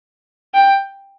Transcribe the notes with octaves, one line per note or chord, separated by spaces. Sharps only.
G5